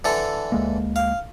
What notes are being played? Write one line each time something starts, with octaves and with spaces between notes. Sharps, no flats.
D3 E3 A4
D2 G#3 A#3
F5